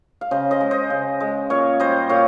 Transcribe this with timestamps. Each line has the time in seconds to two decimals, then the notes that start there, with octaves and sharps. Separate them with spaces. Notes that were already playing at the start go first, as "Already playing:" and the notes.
0.21 F5
0.31 C#3 C5 D#5
0.51 C5 D#5
0.61 G#3
0.71 C5 D#5
0.90 C#3
1.20 G#3
1.50 A#2 C#5 F5
1.80 G3 C5 D#5
2.09 A#2 C#5 F5